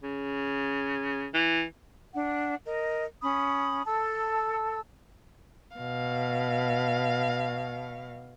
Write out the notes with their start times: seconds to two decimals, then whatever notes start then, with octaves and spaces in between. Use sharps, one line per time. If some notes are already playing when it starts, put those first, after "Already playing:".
0.03 C#3
1.34 E3
2.13 D4 F#5
2.65 A#4 D#5
3.22 C#4 B5 D#6
3.86 A4 A5 E6
5.76 B2 F5